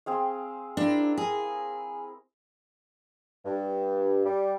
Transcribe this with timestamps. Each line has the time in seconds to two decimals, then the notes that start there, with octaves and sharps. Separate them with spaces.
0.06 C4 G#4 F5
0.77 D4 E4 A#4 F5
1.18 G#4
3.45 G2
4.24 G3